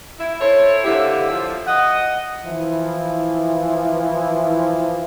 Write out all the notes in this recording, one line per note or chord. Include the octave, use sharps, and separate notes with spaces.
E4
E4 A4 C5 C#5
D3 A#3 C4 E4 G4 E5
F3
D#5 F#5
E3 F3 E4